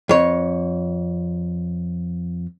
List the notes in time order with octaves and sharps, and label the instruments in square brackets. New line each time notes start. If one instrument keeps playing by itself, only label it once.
[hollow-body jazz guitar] F2 C#5